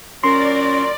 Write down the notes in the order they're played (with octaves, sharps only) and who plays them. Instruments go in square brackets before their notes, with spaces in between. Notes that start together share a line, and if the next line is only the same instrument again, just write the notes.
[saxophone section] A#2 F#3 A#4 [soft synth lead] C#4 [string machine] D5 [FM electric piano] C6